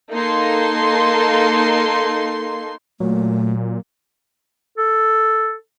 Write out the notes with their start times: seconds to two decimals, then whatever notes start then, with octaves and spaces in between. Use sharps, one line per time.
0.11 A#3 D#4 A4 C6
3.00 A#2 F#3 A3
4.78 A4